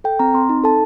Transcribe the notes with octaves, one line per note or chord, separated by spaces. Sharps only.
A4 G5
C4 A#5
C4 C6
D#4
A4 A5